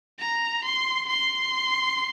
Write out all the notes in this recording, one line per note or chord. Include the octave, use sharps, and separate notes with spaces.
A#5
C6
C6